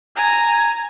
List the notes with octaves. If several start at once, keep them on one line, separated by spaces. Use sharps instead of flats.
G#5 A#5